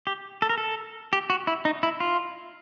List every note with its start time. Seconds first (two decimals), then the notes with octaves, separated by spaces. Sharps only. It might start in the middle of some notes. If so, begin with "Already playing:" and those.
0.07 G4
0.42 A4
0.49 A#4
0.58 A4
1.13 G4
1.30 F#4
1.47 E4
1.65 D#4
1.83 E4
2.00 F4